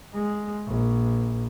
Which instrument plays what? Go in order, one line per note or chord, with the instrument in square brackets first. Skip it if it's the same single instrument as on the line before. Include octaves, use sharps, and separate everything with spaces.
[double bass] G#3
A#1